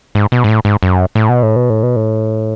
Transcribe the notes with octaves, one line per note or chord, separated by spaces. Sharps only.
G#2
B2
G#2
A2
G#2
F#2
A2
B2
A2
B2
A2
B2
A2